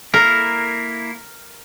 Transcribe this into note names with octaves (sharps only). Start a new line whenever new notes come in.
A#3 E4 A#4